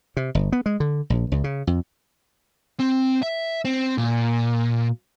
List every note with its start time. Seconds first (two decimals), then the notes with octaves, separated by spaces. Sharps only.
0.17 C3
0.35 G1
0.52 B3
0.66 G#3
0.80 D3
1.10 A#1
1.32 C#2
1.44 C#3
1.67 F2
2.79 C4
3.22 E5
3.65 C4
3.98 A#2